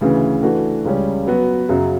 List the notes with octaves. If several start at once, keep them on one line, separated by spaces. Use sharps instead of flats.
D2 C#3 E3
E3 A3 D4 F#4
C#2 C#3 G3 C#4
F#3 B3 F#4
F#2 C#3 F#3